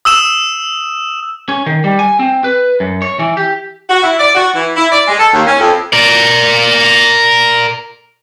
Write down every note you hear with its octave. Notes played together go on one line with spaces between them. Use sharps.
D#6 E6 E7
C#4
D#3
G3
G#5
C4
B4
F#2
C#5
E3
G4
F#4
E4
D5
F#4
E3
E4
D5
G#3
A4
D#2
C#4
F2
A#4 D5